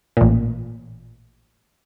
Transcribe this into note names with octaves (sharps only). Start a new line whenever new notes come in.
A1 A#2